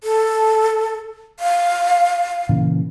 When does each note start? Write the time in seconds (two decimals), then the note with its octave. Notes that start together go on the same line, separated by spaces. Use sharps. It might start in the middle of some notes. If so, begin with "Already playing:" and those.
0.04 A4
1.40 F5
2.49 A#2 C#3 E3